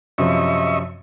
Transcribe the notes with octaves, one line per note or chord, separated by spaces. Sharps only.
F#2 C3 F3 D#5 E5 C#6